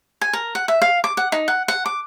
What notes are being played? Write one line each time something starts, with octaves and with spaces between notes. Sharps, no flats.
G#5
A#4
F#5
E5
F5
D6
F#5
D#4
F#5
F#5
D6